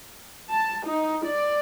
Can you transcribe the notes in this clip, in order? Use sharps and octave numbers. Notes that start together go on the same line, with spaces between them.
A5
D#4
D5